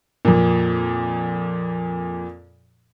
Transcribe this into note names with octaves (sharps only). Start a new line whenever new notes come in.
F2 A#2